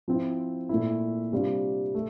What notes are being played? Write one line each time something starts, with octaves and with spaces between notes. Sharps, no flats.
F3 C4 E4
A#2 A3 E4
C3 G3 D4 F4
A3